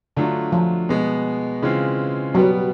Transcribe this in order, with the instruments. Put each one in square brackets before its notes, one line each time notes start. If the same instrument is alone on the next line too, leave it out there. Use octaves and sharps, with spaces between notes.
[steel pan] D3 [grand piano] F#3 A3 D4 F4
[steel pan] F3
[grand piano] B2 G#3 B3
C#3 E3 G#3 C4 F4
[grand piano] B2 G3 B3 [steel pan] F#3